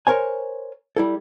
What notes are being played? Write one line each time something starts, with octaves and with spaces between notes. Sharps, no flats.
A#4 C5 C#5 G#5
G3 E4 A4